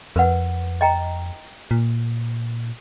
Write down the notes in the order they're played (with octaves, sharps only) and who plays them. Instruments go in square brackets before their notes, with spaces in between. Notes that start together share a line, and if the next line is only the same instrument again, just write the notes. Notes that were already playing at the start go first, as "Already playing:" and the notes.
[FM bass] F2 [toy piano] A#4 B4 F#5
[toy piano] D#5 G5 A#5
[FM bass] A#2